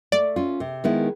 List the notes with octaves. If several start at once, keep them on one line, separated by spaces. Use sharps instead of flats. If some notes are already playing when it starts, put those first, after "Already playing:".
A3 D5
C#4 F4
C3
D#3 G#3 B3 E4